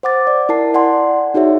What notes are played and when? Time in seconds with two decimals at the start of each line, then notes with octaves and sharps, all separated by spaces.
0.03 C5 F#5 D6 A6
0.27 D5
0.49 E4 A#4 A5 C7
0.74 D5 F#5 G#5 C6
1.34 D#4 F#4 G#4 C#5 E5